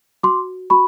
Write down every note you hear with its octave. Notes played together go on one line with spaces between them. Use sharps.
F#4 C6 D6
F#4 B5 C#6